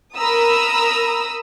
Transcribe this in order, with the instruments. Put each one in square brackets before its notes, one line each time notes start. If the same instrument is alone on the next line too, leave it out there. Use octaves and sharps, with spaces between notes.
[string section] A#4 A#5 B5 D#6 E6